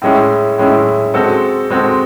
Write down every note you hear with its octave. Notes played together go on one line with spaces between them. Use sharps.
A2 G#3 C#4 E4
A2 G#3 C#4 E4
G#3 C4 F#4 A4
G#3 C4 F#4 A4